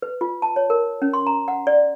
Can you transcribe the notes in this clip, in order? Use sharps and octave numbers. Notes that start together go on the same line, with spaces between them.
B4
F4
A5
C#5
A#4
C#4
C6
A#5
F#5
D5